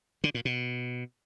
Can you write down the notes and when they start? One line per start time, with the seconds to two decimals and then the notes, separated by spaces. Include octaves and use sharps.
0.24 D3
0.34 A#2
0.45 B2